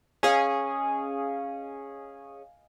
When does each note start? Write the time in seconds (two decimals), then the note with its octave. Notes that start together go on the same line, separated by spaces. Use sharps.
0.23 C#4 G#4 D#5 F5 G#5